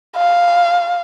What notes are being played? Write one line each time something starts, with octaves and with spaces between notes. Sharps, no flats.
F5